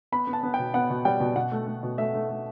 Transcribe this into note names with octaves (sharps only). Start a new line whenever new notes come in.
B3 B5
B3
A5
B3
B2 G5
B3 F#5
B2
G3 G5
B2
B2 F#5
A3
A3
B2
A3 E5
A3
A3